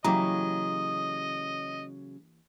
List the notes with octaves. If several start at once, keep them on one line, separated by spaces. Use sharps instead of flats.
C#3 E3 F#3 A#3 G4 D#5 A#5